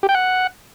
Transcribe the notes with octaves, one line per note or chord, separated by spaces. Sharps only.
G4
G5
F#5